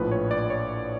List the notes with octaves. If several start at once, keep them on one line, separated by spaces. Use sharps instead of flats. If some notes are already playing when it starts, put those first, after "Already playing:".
Already playing: A#1 A2 F3 B4
C#5
D5
C#5